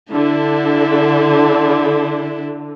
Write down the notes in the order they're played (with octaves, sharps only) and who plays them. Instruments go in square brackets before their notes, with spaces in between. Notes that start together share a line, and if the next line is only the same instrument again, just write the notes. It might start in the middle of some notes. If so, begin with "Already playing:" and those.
[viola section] D3 [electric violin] D4 E4